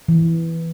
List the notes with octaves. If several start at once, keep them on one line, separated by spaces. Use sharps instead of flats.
E3